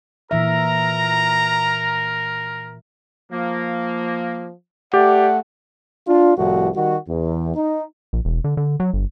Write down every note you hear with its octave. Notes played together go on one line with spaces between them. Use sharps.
A#2 E3 A#4 E5 A#5
F3 A#3
A3 G4 D5 F#5
D4 F4
C2 F2 A2 F3 F#4
D#3 G3 F#4
E2
D#4
A#1
E1
D3
D3
F#3
G1